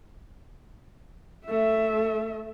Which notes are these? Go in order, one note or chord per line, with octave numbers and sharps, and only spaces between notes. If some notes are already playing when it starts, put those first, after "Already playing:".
A3 E5